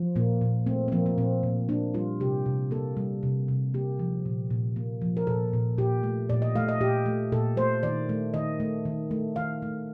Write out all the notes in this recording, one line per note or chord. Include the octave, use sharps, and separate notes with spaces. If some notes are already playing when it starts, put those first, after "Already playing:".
Already playing: F3
A#2 A#3
A#2
A3 C4
C4
F3 A#3
A#3
A#2 C4
A#2
A#3 D4
G3 F4
C3 G4
C3
A#3 A4
G3
C3
C3
A#3 G4
F3
A#2
A#2
A#3
F3
A#4
A#2 A4
A#2
A#2 G4
A3
A#2 D5
D#5
A3 F5
D#5
A#2 G4
A3
A#2 A4
A3 C5
D#3 D5
A3
D#3 D#5
A3
D#3
A3
D#3 F5
A3